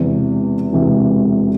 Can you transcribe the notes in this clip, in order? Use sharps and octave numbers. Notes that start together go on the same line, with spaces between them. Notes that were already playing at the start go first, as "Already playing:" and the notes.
Already playing: E1 E2 C3 E3
E1 E2 C3 E3